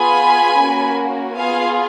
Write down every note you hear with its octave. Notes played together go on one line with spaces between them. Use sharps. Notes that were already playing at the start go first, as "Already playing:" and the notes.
Already playing: B3 F4 G#4 G#5 B5
A#3 C#4 F#4
B3 F4 G#4 F5 G#5